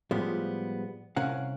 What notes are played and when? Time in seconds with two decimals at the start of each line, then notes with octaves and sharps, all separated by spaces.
0.11 A2 F3 G3 G#3 B3
1.16 C2 C3 C#4 A#4 F5 F#5